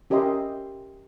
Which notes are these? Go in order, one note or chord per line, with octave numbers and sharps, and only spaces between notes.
C#4 G4 A#4 D#5 E5 C6